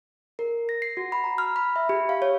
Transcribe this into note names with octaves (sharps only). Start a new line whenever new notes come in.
A#4
A#6
C7
F#4
B5
A#5
F6
B5
E5
G4
F5
C#5